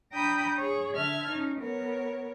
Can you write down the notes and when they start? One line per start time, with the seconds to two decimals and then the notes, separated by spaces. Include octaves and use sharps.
0.12 D4 G5 A#5 B5 D#6 G6
0.57 G#4 C#5
0.96 D3 E5 A5 F6 G#6
1.29 C#4 D#4
1.60 B3 A#4 C#5